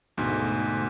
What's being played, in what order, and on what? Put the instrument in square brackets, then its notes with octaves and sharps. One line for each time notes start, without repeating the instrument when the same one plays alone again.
[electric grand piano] D2 G#2 B2